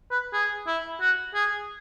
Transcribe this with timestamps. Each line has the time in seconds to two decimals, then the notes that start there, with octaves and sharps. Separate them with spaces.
0.11 B4
0.33 G#4
0.67 E4
1.01 F#4
1.34 G#4